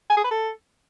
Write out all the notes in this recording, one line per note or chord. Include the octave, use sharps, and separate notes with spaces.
G#5
G#4
B4
A4